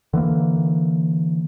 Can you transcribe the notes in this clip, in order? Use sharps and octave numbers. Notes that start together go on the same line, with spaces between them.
D3 E3 G#3 A#3